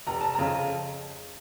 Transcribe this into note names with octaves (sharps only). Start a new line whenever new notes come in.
F1 A#5
A5
F2 C#3 A#5